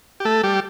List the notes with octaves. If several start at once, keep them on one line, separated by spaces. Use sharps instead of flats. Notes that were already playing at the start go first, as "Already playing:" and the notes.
G4
A3 A4
G3 G4